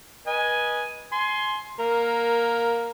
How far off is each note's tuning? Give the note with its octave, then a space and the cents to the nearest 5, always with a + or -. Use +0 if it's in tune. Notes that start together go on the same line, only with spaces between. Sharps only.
B4 -30 D#5 +0 G#5 +0
G#5 +25 C6 +5
A#3 +10 A#4 +0